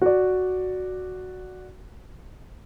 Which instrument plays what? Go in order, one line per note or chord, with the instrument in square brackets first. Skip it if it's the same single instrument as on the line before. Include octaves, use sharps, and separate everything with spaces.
[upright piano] F#4 D5